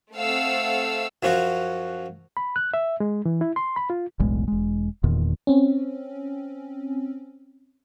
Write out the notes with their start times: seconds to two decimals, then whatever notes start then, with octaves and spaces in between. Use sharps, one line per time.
0.15 A3 C4 F5 F#5 E6
1.23 F#2 F3 C#4 F4 F#4
2.37 B5
2.56 F#6
2.74 E5
3.00 G#3
3.25 E3
3.41 E4
3.56 C6
3.76 B5
3.90 F4
4.20 E1 B1 A2 G#3
4.48 E1 G#3
5.04 E1 E2 A#2 D#3
5.47 C4 C#4